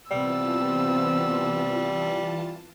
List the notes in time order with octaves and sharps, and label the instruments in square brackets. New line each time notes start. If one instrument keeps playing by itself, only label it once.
[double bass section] C3 B3 C4 [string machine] E3 F4 A5 [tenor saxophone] G3 [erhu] E6